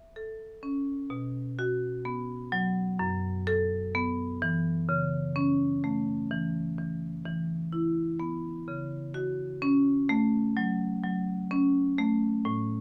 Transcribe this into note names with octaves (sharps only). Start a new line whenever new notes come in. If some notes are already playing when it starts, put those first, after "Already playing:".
Already playing: E5
A4
C#4
B2
F#4
B3
F#3
F#2
A4
B3
E3
C#3
C#4
A3
E3
E3
E3
E4
B3
C#3
F#4
C#4
A3
F#3
F#3
C#4
A3
A2